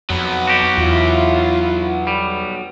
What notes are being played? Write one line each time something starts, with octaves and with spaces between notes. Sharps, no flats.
F2 F#3 B3
F#4 G4
E2 E4 F4
G3